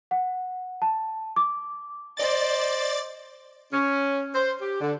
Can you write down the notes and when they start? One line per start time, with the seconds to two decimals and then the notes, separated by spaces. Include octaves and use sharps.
0.11 F#5
0.82 A5
1.36 D6
2.17 C5 D5 D#5 A6
3.73 C#4
4.35 C5
4.61 G4
4.81 D3